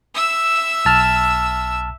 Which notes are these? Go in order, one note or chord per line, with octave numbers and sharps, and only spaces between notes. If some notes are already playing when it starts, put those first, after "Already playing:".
E5 E6
B1 A5 F6